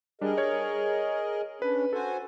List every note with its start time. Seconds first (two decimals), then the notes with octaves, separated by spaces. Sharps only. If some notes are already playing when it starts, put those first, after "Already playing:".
0.21 G3 D4 G#4 A#4 D#5
0.38 C#5 G#6
1.62 C#4 D4 B4
1.93 F#4 A4 C5 G#5